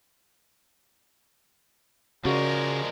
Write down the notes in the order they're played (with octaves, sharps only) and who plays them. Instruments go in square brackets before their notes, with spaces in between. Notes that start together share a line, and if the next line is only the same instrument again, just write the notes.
[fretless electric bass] C#3 [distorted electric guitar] F3 G#3 [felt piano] F#4 [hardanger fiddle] A#4 D5